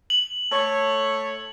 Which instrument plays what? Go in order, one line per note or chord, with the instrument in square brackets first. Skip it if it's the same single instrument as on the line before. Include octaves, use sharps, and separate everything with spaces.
[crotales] F#7
[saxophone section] A3 C#5